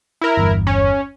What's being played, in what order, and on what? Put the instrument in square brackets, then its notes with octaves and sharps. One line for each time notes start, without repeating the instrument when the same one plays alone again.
[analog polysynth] E4 A#4
[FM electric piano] G1 E2 G2
[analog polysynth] C#4